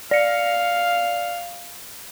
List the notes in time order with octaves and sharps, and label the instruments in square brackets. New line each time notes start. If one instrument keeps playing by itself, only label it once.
[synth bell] D5 C#7 [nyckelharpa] F5